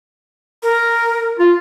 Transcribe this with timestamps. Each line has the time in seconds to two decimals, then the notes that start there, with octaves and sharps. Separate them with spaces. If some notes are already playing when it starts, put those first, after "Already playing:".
0.63 A#4
1.40 F4 F5